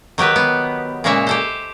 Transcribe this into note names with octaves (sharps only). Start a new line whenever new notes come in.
D#3 F#3 G4 B4
B3
A#2 C#3 G#3 A#3 C#5 E5
G4 A4 C5